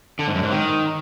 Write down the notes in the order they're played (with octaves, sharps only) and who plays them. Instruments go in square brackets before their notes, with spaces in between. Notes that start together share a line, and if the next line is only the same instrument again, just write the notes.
[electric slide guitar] D3
G#2
F#2
G#2
D#3